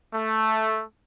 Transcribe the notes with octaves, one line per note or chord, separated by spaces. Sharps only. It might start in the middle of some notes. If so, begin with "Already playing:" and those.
A3